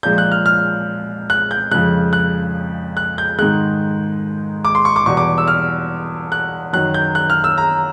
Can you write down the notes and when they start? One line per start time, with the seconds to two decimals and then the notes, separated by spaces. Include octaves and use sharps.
0.03 A#2 F3 G#3 G6
0.18 F#6
0.32 F6
0.46 F6
1.30 F#6
1.51 G6
1.71 F2 C#3 F3 G#3 F#6
2.13 F#6
2.97 F#6
3.18 G6
3.39 G#2 D#3 G#3 F#6
4.65 D6
4.75 C6
4.85 C#6
4.96 D6
5.06 E2 B2 G3 C#6
5.17 D6
5.38 E6
5.48 F6
6.32 F#6
6.73 F#2 D#3 F#3 F#6
6.94 G6
7.15 F#6
7.30 F6
7.44 E6
7.58 A#5